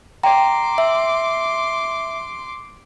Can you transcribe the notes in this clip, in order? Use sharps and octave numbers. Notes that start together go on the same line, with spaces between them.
D5 G5 A#5 C6 D6
E5